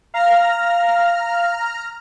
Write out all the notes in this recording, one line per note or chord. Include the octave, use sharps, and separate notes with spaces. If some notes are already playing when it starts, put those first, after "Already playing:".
F5 A#5 F6